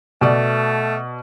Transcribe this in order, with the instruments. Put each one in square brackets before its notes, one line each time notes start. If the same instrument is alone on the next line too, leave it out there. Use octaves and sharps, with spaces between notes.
[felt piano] B2 D5 [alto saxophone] A3